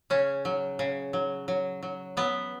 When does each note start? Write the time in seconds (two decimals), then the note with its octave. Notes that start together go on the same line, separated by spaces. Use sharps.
0.10 C#3 C#4
0.45 F#3
0.79 C#3
1.13 F#3
1.48 F#3
1.83 F#3
2.17 F#3 B3